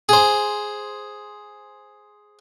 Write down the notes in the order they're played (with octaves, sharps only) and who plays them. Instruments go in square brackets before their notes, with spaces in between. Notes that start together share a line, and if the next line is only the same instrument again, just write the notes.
[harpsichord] G#4 C5